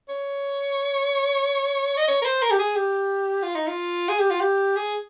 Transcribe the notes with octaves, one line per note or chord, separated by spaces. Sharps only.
C#5
D#5
C#5
A#4
C5
A#4
G4
G#4
G4
F4
D#4
F4
G#4
G4
F4
G4
G#4